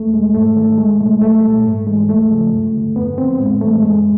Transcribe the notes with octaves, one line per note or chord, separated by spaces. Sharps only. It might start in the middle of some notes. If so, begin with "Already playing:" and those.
Already playing: E2 A3
B2 G3 G#3
G#2 A3
D#3 G3 A3
C2 G#3
B2 F#3 A3
C2 A3
A#2 G3
G#2
E3 G3 G#3
D#2 A3
C#3 F3
G2
D3 G3
F2 B3
D3 F3 C4
A2 G#3
E3 G3 A3
F#2 G#3